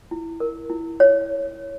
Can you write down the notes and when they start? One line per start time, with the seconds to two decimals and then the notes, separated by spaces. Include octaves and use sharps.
0.11 E4
0.40 A#4
0.70 E4
1.00 C#5